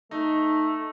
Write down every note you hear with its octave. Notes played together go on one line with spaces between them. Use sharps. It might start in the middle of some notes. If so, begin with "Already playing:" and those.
A3 D#4